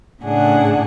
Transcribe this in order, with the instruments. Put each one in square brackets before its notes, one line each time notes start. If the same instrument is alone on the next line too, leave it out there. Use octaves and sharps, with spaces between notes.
[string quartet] A2 C#3 D4 G#4 F#5